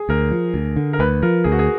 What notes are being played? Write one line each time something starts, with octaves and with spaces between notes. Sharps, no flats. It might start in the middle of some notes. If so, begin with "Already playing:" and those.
Already playing: G#4
D2 A#4
F3
D2
D3
A#4
D2 B4
F3 A#4
D2 G#4
F#4
G#4